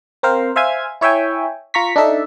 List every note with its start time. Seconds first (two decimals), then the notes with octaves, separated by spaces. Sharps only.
0.23 C4 A#4 C5 F5
0.56 C5 E5 F5 G#5 G#6
1.01 E4 C#5 E5 G5 G#5
1.74 F4 A#5 C#6 B6
1.96 D4 D#4 A4 E5